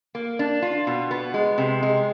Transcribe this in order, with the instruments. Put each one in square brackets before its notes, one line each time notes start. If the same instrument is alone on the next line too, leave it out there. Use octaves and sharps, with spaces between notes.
[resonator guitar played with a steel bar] A#3
D4
F4
B2
B3
G#3
C3
G#3